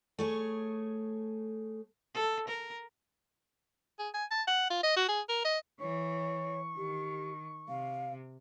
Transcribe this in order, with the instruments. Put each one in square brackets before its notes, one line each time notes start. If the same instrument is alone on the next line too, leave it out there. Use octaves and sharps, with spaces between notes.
[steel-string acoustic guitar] A3 G#4 C#5
[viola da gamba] A4
A#4
[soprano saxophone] G#4
G#5
A5
F#5
F4
D#5
F#4
G#4
A#4
D#5
[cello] E3 [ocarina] C#5 [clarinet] C#6
[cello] D#3 [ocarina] G4
[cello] C3 [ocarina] F5